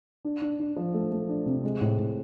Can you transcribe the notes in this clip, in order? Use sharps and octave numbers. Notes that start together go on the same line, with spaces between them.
D4
D4
D4
F3
A3
A3
D4
C3
G#3
A2
A2